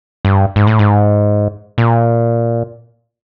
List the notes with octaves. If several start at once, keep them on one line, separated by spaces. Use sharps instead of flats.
G2
G#2
A2
G#2
A#2